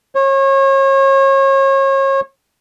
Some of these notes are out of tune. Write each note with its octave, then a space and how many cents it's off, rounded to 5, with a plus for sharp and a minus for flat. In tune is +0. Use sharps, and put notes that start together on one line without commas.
C#5 -35